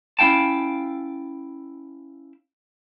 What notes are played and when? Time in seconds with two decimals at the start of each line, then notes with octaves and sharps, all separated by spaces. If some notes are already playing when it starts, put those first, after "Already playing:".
0.19 C#4 E4 F5 G5 A5